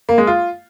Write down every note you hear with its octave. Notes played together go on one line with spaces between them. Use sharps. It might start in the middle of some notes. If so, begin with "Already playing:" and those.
A#3
G#3
F4